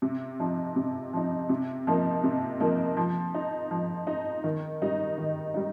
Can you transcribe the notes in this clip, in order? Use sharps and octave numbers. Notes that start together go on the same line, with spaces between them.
C3
F3 D#4
C3
F3 D#4
C3
F3 A#3 D#4
C3
F3 A#3 D#4
F3
D#4
F3
D#4
D#3
G3 D#4
D#3
G3 D#4